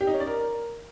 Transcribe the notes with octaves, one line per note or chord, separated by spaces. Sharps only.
G4
D#4
C#4
D5
A#4